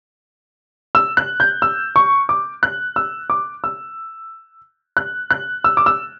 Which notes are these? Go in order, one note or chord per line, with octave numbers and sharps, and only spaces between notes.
E6
F#6
G6
E6
C#6
D6
F#6
E6
D6
E6
F#6
F#6
E6
D6
E6